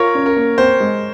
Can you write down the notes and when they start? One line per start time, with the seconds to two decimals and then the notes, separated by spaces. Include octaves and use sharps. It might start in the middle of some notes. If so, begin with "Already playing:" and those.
Already playing: F4 A#4 C#5
0.15 C#4
0.26 A#4
0.36 A#3
0.58 C4 C5
0.80 G#3